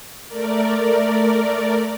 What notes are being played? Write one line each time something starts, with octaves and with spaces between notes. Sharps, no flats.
A3 A#4 D5